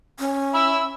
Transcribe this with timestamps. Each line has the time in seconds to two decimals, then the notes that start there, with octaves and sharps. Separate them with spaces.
0.19 C#4
0.54 E5 B5 E6